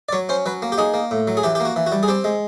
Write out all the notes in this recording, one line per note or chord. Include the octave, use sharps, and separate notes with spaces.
D5
F#3 C#5
C#4 C5
F#3 B4
A#3
G4
D#4 G#4
A#3
A2
F#3
G#4
E3 G4
A#3 G4
F#4
E3
F#4
G3
G#4
C4 G4
G#3